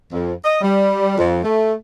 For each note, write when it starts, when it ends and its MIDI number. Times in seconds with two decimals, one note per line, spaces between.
0.12 0.33 41
0.43 0.58 75
0.61 1.15 55
1.17 1.40 41
1.44 1.74 57